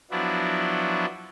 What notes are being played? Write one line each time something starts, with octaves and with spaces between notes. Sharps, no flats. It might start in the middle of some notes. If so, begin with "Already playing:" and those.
F3 F#3 B3 D4 E4 F#4